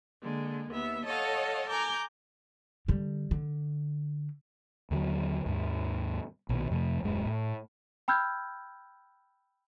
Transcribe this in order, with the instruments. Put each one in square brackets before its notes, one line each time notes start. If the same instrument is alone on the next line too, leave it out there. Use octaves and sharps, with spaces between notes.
[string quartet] D3 G#3 A#3
D#2 B3 E5
A4 C#5 D#5 F5 F#5
G#5 A#5 D6 G6
[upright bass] D3 G3
D3
[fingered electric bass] D#2 D3 F3 F#3
D#2 G#2
A#1 B2 D#3
F2 C3 F3 A3
D#1 F#2 G#3
A2
[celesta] G5 B5 E6 F6 G6 G#6